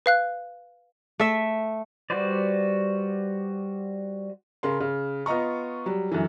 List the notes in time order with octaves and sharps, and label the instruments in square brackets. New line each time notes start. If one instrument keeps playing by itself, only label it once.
[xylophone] B4 F5 F#6
[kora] A3 E5
[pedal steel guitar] G3 F#4 B4 C5 D5
[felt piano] C#3 A#4 C6
C#3
B3 F4 D#5 A#5 C#6
F#3 G3
F#2 D3 E3